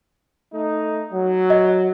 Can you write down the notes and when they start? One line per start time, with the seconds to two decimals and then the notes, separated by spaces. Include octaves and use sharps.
0.53 A3 D#4
1.12 F#3
1.50 D#5